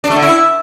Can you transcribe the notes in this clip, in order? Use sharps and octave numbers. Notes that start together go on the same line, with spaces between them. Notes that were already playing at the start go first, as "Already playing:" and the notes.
D4
A3
D3
E4